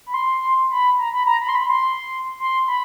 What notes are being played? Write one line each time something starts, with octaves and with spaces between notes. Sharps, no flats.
B5
C6
B5
A#5
B5
A#5
B5
C6
B5
C6
C6
B5